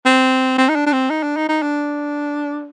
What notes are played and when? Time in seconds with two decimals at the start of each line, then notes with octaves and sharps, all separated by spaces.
0.06 C4
0.58 C4
0.69 D#4
0.75 D4
0.86 D4
0.92 C4
1.10 D#4
1.23 D4
1.36 D#4
1.49 D#4
1.62 D4